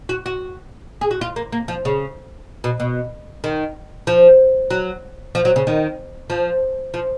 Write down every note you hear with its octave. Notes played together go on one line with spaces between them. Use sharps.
F#4
F#4
G#4
F#4
F4
A#3
A#3
F3
C#3
B2
B2
D#3
F3
F#3
F3
F#3
C#3
D#3
F3
F3